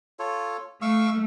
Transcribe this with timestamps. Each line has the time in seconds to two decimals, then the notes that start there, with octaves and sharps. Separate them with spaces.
0.19 F4 A4 C#5
0.82 A3 F5 C#6 E6